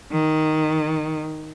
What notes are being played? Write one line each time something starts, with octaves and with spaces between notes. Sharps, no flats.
D#3